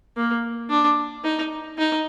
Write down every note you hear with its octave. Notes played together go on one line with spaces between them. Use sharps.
A#3
D4
D#4
D#4